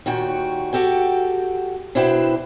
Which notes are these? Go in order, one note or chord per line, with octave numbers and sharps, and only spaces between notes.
D#2 A#2 F#4 G5
F#4 G4 A4 G5
B2 D4 E4 B4 C5 G5